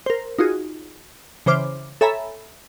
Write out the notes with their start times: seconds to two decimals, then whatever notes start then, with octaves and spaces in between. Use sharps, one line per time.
0.06 A#4 C5
0.39 D#4 F4 F#4 G#4
1.46 C#3 E3 C5 D6 F6 C7
2.01 A4 C#5 E5 G#5 A#5 B5